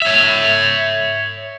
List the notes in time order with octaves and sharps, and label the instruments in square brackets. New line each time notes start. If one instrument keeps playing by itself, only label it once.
[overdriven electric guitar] C#5 E5